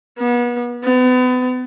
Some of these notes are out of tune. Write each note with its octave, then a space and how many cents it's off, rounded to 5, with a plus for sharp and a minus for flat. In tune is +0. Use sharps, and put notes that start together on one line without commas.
B3 -35
B3 +35